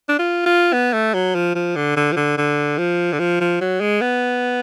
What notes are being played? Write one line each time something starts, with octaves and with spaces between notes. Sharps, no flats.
D4
F4
F4
B3
A3
F#3
F3
F3
D3
D3
F3
D3
D3
F3
D3
F3
F3
F#3
G#3
B3